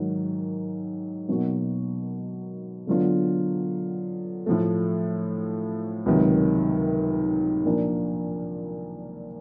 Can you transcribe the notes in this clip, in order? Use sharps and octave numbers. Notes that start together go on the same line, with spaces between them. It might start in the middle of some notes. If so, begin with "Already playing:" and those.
Already playing: G#2 D#3 F#3
B2 F#3 A#3 D#4 F#4
D3 F#3 B3 D4 F4
A2 F3 A3
C#2 C3 D#3 F#3
A#2 F3 A#3 D4